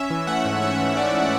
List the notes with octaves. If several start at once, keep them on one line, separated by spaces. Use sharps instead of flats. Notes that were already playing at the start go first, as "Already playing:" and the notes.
Already playing: C#4 E5
E3
A3 F#5
G#2
C#4 E5
E3
A3 D5
G#2